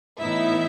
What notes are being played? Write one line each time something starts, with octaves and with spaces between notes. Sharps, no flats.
A2 E3 B3 D#4 E4 E5